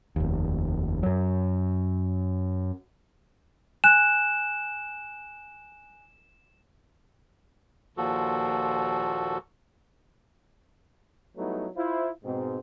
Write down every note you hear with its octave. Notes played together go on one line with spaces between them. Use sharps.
F1 D#2
F#2 F#3
G#5 F#6 E7
D#2 A#2 F3 F#4 A4
F#3 G3 A3 B3 D#4 E4
E4 F4 C5
G#2 B2 C4